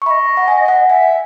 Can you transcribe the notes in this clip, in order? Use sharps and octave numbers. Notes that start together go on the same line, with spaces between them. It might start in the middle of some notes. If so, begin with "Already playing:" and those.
C#6
D#5 E5 B5
F#5
G#5
F#5
E5 G#5